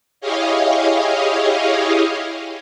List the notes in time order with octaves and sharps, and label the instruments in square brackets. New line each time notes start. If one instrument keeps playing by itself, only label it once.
[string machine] E4 G4 G#4 C#5 D#5 F5